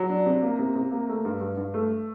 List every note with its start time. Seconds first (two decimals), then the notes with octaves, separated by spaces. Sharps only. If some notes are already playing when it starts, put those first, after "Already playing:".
Already playing: F#3
0.09 D4
0.26 C3
0.42 A#3
0.59 C3
0.75 C3
0.91 A#3
1.08 A3
1.25 G2
1.41 G2
1.57 G2
1.74 A3